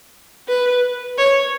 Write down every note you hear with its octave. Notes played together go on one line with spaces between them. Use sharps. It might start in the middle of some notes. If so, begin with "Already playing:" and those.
B4
C#5